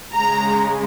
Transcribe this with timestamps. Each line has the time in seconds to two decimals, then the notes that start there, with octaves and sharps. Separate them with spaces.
0.14 C#3 G#3 A#5